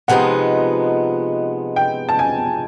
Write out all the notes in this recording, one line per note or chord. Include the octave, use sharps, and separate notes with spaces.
C3 F3 G#3 B3 D#4 F#5
G5
A5
G#5